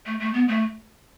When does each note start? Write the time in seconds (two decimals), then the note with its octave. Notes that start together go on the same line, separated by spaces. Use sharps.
0.06 A3
0.20 A3
0.34 B3
0.48 A3